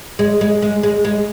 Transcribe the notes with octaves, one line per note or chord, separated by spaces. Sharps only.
G#3
G#3
G#3
G#3
G#3